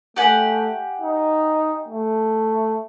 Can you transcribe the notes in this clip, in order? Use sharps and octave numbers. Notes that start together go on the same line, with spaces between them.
A3 G4 F#5 G#5
D#4
A3